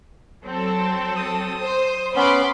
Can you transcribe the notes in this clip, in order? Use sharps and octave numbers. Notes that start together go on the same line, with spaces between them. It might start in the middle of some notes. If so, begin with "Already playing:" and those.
F#3 C4 A4
D#6
C5
B3 C#4 B5 C6 D6